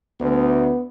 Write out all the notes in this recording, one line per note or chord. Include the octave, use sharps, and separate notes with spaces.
D2 B3